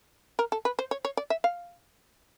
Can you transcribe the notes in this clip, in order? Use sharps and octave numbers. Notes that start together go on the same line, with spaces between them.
A#4
A4
B4
C5
C#5
C#5
D5
E5
F5